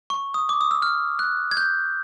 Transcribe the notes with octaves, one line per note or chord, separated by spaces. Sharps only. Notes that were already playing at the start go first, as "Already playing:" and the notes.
C#6
D#6
D6
D#6
E6
F6
F#6
G#6
G6